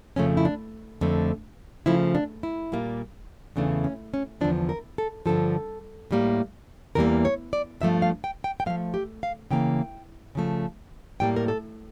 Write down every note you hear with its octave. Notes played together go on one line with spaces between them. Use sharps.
F2 C#3 F3 A3 C#4
E4
D4
F2 D3 A3
C#3 F3 A3 E4
D4
E4
A#2 G3 A#3
E2 C#3 E3 A3 D4
C#4
C#4
E2 D3 F3 D4
A#4
A4
G2 D3 F3 A4
A2 G3 A#3
E2 E3 G3 A#3 A#4
C#5
D5
G2 F3 A3 E5
F5
G5
G5
G5
A2 F3 A3 F5
G4
F5
C#3 E3 A#3 G5
C#3 F3 A3
A2 G3 A#3 G5
A#4
A4